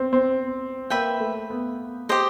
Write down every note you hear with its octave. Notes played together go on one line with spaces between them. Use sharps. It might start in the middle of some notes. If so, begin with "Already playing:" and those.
Already playing: C4
C4
A#3 B4 E5 G5
A3
B3
G4 C5 D#5